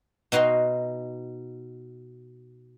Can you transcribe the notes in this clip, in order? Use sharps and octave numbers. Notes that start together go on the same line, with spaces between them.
B2 D#4 F#4 F5 C6